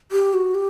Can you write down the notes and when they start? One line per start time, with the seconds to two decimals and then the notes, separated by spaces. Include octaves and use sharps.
0.12 G4
0.34 F#4
0.55 G4